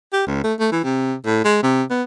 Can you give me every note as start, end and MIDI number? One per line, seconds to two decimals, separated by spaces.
0.13 0.24 67
0.27 0.41 37
0.44 0.54 57
0.60 0.68 57
0.72 0.80 52
0.84 1.15 48
1.26 1.40 45
1.45 1.59 56
1.63 1.83 48
1.90 2.03 59